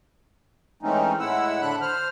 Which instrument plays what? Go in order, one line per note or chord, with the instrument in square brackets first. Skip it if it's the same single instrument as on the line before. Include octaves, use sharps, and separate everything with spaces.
[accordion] E3 G#3 A3 C4 C#4 D#4
A2 G#3 E4 F#5 E6
D3 A3 D4 B5 F#6
C5 F6